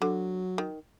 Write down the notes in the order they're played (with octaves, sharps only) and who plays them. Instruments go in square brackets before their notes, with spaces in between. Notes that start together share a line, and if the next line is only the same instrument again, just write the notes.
[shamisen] D3 [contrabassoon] F#3
[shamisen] D#3